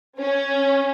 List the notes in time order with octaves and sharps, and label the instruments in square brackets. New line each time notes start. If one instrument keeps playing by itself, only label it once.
[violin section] C#4